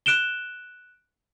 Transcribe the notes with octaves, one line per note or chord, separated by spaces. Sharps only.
F#6 D7 E7 G7